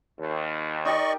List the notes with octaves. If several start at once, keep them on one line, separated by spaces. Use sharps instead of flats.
D#2
D#4 G4 A#4 D5 D#5 C#6